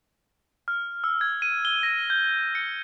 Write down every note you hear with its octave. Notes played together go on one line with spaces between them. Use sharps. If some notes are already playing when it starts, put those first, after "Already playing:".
F6
E6
G#6
D#7
G7
A#6
G6
C#7